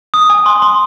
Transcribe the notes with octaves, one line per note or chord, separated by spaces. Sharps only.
D#6
G#5
C6
C6